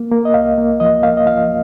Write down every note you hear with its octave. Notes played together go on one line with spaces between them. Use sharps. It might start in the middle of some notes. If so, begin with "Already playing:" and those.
Already playing: A#3
A#3
D#5
C2 F5
A#3
F3 D#5
A#3 F5
D#5
F3 F5